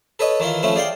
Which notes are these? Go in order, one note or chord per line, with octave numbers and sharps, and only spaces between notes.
A4 B4 C#5 D#5
D#3 E3 E4 F4
F3 A3 C#4 E4
G#4 D5 F5 G5